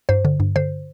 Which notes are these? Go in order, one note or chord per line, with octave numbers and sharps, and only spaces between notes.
G2 C5
D3
G2
D3 C5